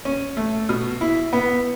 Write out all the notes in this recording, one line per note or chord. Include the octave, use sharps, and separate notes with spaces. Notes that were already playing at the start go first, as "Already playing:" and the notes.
C#4
A3
B2
E4
B3